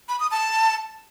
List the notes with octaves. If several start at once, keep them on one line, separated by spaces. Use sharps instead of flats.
B5
D#6
A5